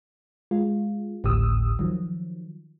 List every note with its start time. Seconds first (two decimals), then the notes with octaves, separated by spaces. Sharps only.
0.51 G#3 F4
1.24 G#1 D2 A2 G4 D#6 E6
1.79 D#3 F3 F#3